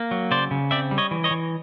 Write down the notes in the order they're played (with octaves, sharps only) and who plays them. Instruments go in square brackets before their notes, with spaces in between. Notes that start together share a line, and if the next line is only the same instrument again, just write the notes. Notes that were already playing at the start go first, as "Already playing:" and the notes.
Already playing: [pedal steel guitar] A#3
F#3
C#3 C5 D5
C#3
C4 D5 E5
G3
C#5 D#5
E3
C#5 D#5
E3